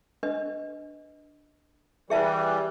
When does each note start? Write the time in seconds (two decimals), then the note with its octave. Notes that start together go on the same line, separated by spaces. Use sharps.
0.23 D4 B4 D#5
2.10 E3 G3 G#4 E5 A5